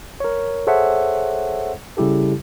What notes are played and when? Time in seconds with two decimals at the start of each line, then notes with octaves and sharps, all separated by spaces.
0.20 A#4 C#5
0.67 G#4 A4 C5 C#5 E5 F#5
1.97 C#3 G3 E4 G4 A4